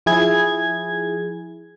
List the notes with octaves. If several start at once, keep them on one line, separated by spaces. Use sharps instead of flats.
F3 E4 G#4 G#6